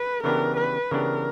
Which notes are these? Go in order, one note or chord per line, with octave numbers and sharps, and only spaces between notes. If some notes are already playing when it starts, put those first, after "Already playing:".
Already playing: B4
C#3 E3 B3 D4 G4 A#4
B4
C#3 E3 B3 D4 G4 A#4